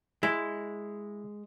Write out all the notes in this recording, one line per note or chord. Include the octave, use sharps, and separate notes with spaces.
G#3 E4